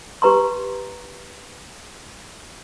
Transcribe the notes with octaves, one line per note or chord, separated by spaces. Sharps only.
G4 B4 A#5 C6